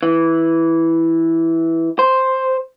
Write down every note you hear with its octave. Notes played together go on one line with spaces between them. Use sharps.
E3
C5